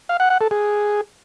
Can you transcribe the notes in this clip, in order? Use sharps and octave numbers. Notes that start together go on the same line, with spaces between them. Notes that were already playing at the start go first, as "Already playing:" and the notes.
F5
F#5
F#5
A4
G#4